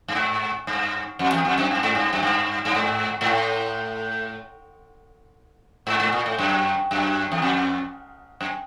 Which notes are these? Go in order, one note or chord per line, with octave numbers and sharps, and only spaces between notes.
G2
G#2
G2
F2
E2
F2
F#2
G2
G#2
G2
F#2
G2
G2
G#2
G#2
A2
G#2
G#2
A#2
A2
F#2
F#2
E2
F2
F#2